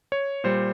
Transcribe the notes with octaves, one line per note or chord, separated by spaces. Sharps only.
C#5
A#2 G3 C5